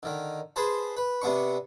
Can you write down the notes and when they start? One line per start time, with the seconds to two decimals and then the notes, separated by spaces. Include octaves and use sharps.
0.03 D3 D#3
0.56 G#4 B4 C5 A5
0.97 B4
1.22 C3 B3 D4 C#6